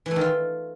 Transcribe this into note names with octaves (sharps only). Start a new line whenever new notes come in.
E3
A3
D#3
F4